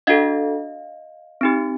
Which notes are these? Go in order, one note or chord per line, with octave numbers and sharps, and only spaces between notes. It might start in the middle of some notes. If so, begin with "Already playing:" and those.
D4 F#4 A4 D#5 F5
C4 D#4 G4